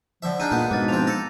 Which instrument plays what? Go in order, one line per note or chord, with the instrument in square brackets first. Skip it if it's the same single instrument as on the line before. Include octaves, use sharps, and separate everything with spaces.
[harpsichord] D3 E5 [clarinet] F3
[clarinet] D4 [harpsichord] D#4 G#4 [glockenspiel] F6 G6 D#7
[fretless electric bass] A#2 [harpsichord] G#3 B3 [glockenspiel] A#5 G6
[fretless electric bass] G#2 B2 [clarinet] D4 [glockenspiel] D6 F6 A6
[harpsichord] F3 C4 [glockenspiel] F7
[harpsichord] A4 [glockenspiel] A#6 C#7